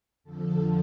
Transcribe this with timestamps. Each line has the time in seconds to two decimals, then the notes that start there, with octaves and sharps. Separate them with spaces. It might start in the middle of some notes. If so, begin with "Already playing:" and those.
0.24 F2 D3 F3 A4